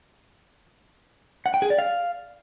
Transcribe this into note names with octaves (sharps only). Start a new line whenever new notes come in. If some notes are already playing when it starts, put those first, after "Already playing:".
F#5
G5
G#4
D5
F5